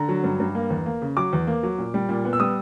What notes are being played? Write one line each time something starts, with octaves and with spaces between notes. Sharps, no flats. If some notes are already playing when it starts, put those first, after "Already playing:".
Already playing: D3 A#5
F#3
G2
G2
A#3
E2
A#3
C#3
F#3 D6
E2
A#3
F#3
A#2
G3
A#2
B3
E6
G3 D#6